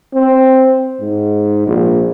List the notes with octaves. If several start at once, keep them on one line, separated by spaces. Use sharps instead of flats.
C4
G#2
A#1